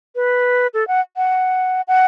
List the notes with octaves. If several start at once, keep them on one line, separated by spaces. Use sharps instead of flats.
B4
A4
F#5
F#5
F#5